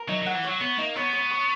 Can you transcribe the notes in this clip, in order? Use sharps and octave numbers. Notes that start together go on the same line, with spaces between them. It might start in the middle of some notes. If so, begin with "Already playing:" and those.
Already playing: A#4
F#3 D#4
F#3 F#5
E3
F#3 C#5
B3 C#5
A#3 D#4
B3 C#5
C#5
C#6